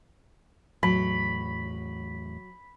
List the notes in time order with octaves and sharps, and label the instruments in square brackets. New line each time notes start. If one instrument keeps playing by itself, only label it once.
[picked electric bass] E2 A2 [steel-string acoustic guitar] F#3 [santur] B5